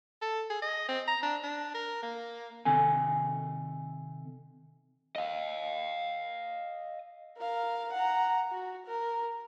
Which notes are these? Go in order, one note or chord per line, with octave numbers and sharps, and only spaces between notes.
A4
G#4
D#5
C4
A#5
D4
D4
A#4
A#3
C3 D#3 C4 A4 G#5
D#5 F5
A#4 F5
F#5 A#5
F#4
A#4